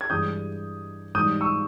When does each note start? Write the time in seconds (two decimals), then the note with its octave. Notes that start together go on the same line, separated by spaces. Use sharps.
0.01 G#6
0.10 G2 E3 G#3 D#6 G6
1.15 G#2 E3 G3 D#6 G6
1.41 C#6 E6